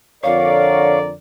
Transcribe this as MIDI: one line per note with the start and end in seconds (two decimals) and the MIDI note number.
0.23 1.12 41
0.23 1.12 50
0.23 1.13 70
0.23 0.99 73
0.23 1.13 74
0.23 0.98 77